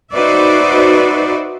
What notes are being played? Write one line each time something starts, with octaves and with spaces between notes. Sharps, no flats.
D#4 F#4 B4 C5 D5 E5